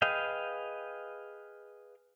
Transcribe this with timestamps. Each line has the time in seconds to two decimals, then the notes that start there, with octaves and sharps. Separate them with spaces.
0.02 G#4 B4 D#5 F5 G5